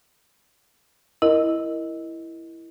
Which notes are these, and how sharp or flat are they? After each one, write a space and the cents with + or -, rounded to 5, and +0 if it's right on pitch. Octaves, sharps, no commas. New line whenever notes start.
E4 +5 A#4 +0 D#5 +0